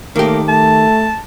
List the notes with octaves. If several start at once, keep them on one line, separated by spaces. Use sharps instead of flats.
D#3 A3 A#3 G4
A3 A5